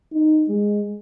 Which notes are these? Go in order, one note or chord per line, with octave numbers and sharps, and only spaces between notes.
D#4
G#3